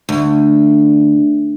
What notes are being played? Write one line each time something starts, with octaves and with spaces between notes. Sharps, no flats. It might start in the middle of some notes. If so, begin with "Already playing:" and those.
D2